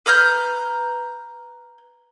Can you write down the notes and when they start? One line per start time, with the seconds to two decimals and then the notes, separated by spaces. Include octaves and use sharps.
0.06 B4 A#5 F6 G6